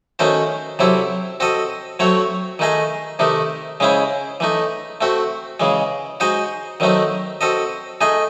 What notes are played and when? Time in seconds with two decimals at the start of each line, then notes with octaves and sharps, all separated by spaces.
0.19 D#3 A3 C#4 F#4 C5
0.79 C3 F#3 C4 E4 A4
1.40 C4 F#4 A4 D#5
1.99 F#3 A3 C4 F#4 C#5
2.59 D#3 A3 D#4 G#4 D#5
3.19 C3 D#3 A3 D#4
3.80 C#3 G#3 C#4 E4 C5
4.40 E3 A3 D#4
5.01 A3 C4 F#4
5.60 C#3 E3 G#3
6.20 G#3 D#4 F#4 C5 D#5
6.80 D#3 F#3 A3 C4 D#4
7.41 C4 F#4 A4 D#5
8.01 A3 D#4 G#4 D#5